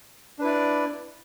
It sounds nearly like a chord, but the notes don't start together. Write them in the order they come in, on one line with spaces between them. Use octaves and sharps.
D4 B4 E4 D5